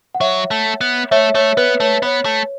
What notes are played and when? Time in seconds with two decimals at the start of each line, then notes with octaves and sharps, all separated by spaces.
0.15 F#5
0.21 F#3 C#5 E5
0.51 A3
0.81 B3
1.11 A3 C#5 E5
1.34 A3 C#5
1.57 B3 B4
1.80 A3 C#5
2.02 B3 C#5
2.25 A3